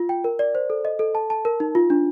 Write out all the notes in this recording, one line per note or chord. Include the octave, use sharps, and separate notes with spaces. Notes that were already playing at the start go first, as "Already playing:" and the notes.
Already playing: F4
G5
A#4
D5
C5
A4
D#5
A4
A5
A5
A#4
D#4
F4
D4